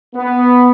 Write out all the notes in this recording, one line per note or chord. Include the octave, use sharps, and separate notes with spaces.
B3